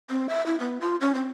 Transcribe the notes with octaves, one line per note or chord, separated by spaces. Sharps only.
C4
E5
E4
B3
F4
C#4
C4